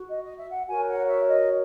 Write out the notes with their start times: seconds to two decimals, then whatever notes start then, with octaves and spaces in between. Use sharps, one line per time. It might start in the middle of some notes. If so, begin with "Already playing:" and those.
Already playing: F#4
0.09 D#5
0.23 D#5
0.38 E5
0.52 F#5
0.68 F#4 A#4 C#5 G#5
0.88 F#5
1.07 E5
1.28 D#5